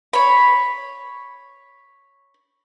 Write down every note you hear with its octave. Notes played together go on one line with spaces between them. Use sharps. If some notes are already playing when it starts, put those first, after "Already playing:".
C#5 B5